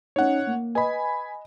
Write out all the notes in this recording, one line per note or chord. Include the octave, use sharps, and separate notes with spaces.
C#4 D#4 C#5 F#5
A#3
B4 D#5 G#5 B5